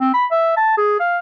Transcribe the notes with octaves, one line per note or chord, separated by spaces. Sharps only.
C4
B5
E5
A5
G#4
F5